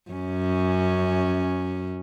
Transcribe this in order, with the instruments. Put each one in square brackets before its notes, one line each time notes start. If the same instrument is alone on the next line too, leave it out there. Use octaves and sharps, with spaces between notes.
[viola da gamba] F#2 C#4